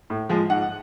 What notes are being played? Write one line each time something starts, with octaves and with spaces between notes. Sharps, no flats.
A2
F3 G#3
G#2 F#5